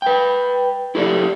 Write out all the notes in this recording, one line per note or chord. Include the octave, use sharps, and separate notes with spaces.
B4 G5
E4 G4 A4 D5